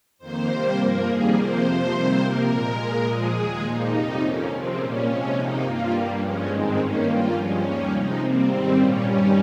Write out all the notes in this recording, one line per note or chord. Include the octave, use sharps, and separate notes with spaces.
F2 D#3 A#3 C5
C3 G3 A#3 C5
G2 F3 A#3 A#4
F2 D#3 G3 A#3 G#4
C3 F3 A#3 C5
F2 C3 F3
C3 D#3 G3 A#3
C3 F3 A#3 A#4
A#2 G#3
A#2 G#3 A#4
A#2 F3 G#3 G#4
D#2 D#3 G#3 G#4
A#2 F3 A#3 D#4
F2 C3 G3
F2 D#3 A#3 C#4
C3 F3 G#3 C4
A#2 G3 A#3 C#4
C3 F3 G#3 C#4
C3 D#3 A#3 D#4
G2 G3 A#3 F4
G2 G3 A#3
G2 F3 G#3 C#4
G#2 D#3 G#3 C4
G2 D#3 A#3 C#4
G2 G3 A#3 F4
G2 F3 G#3 C#4
D#2 D#3 G3 A#3
C3 F3 G#3 D#4
C3 G3 A#3 C4
G#2 D#3 G3
A#2 G3 A#3 C#4
G2 D#3 G3